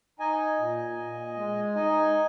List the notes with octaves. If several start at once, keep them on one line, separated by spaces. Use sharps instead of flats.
D#4 D#5 G#5
A#2
A#2
G#3
D#4 D#5 G#5